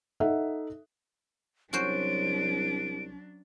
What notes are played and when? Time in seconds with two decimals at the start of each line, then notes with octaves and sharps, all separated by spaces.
0.20 D#4 A4 E5 F#5
1.73 C2 F#3 C#4 D4 F#4 C5 D7